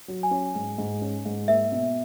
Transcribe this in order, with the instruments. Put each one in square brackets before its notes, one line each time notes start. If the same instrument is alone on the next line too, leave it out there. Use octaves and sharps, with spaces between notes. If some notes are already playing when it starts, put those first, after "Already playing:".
[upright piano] F#3
[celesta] G#5
[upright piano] C#4
G#2
G#2
C#4
G#2
[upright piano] A#3 [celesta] E5
[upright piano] B2